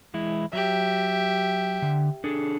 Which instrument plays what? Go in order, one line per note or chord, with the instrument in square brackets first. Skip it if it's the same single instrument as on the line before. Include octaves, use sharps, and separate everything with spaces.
[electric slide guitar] E3 G#3 E4
[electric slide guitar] F#3 [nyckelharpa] G4 E5
[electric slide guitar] D3
D4 G#4 A4